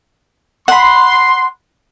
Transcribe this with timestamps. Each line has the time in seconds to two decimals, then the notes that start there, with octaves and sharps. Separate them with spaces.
0.68 F#5 B5 C6